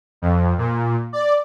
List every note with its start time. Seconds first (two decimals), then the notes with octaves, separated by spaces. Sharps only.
0.22 F2
0.58 A#2
1.13 D5